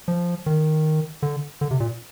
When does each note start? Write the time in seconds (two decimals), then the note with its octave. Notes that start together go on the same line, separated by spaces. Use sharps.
0.08 F3
0.46 D#3
1.23 D3
1.61 D3
1.71 C3
1.80 A#2